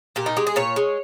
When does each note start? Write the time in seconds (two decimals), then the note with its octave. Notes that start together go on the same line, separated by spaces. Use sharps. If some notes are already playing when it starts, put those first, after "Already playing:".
0.16 A#2 G4
0.26 D#4
0.37 G#3 G4
0.47 G#4
0.56 A#2 C#5
0.76 G#3